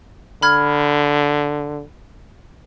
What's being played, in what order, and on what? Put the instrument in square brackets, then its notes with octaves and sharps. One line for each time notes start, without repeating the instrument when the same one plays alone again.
[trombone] D3 [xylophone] B5 F6 G#6